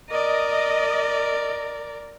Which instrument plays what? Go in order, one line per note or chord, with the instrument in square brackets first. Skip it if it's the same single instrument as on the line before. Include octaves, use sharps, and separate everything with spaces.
[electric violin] A#4 D5 [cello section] D#5